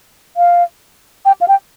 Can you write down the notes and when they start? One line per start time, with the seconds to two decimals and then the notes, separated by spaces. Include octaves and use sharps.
0.37 F5
1.25 G5
1.41 F5
1.48 G5